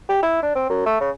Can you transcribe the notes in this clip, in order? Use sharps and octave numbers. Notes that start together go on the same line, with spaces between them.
G4
E4
D4
C4
F#2
A3
C#3